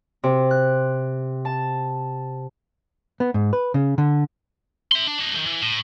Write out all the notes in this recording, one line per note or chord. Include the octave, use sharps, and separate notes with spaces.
C3
F#6
A5
B3
G#2
B4
C#3
D3
E5 C6
D4
D4 D#5
C2 D#3
E3
A2